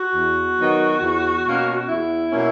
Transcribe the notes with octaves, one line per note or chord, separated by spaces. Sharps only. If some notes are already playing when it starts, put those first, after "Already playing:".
Already playing: F#4
E2
D#3 F#3 B3
E2
B2 A#3 C#4
E2 E4
B2 A#3 C#4